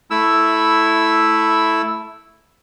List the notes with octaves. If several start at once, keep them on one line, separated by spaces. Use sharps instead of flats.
A3 E4 E6